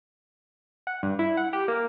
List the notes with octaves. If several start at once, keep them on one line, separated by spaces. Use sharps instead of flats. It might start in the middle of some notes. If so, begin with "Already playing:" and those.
F#5
G2
E4
F#5
G4
A#3